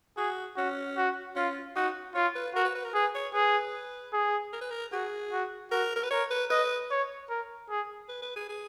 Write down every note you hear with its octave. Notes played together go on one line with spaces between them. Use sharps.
F#4 G#4
C#4 F#4
F#4
C#4 F4
D#4 F#4
F4 C#5
B4
F#4 A#4
B4
B4
A#4
G#4 B4
C#5
G#4 B4
G#4
A#4
B4
A#4
F#4 G#4
F#4
F#4 A#4
A#4
B4
A#4 C#5
B4
B4 D#5
C#5
A#4
G#4
B4
B4
G#4
G#4